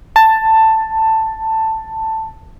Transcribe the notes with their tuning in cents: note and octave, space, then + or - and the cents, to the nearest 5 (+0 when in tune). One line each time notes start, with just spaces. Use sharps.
A5 +10